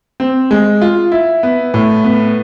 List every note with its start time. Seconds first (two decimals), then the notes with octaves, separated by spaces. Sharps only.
0.20 C4
0.51 G#3
0.81 F4
1.12 E4
1.43 B3
1.74 A2
2.04 B3